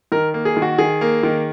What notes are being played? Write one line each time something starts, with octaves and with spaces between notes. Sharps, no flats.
D#3 A#4
A#3
G#4
D#3
F#4
D#3 G#4
A#3
D#3